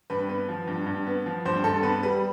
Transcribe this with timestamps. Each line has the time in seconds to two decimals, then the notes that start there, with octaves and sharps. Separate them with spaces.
0.10 G2 B4
0.29 B3 B4
0.49 F3
0.67 G2
0.86 G2
1.07 B3
1.26 F3
1.46 G2 C5
1.64 G2 A4
1.83 B3 B4
2.03 G3 B4